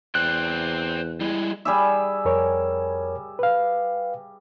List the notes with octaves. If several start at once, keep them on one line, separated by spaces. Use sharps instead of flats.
E2 C5 D5 G5 F#6
G3 G#3 E4
G3 G#4 E5
F2 A#4 C#5
B4 F5